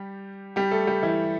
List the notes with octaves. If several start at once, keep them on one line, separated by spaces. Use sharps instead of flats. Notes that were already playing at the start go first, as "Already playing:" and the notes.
Already playing: G3 G4
G3 G4
A3 A4
G3 G4
E3 E4